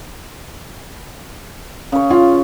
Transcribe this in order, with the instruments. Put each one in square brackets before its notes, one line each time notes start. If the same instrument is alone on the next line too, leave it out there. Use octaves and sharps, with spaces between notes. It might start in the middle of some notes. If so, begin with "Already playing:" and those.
[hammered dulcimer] C#3 C#5
[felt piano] F4